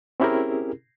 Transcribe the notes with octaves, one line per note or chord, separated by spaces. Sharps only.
C4 C#4 E4 G4 G#4 A#4